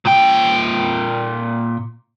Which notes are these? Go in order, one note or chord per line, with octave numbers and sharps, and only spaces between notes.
A#2 G5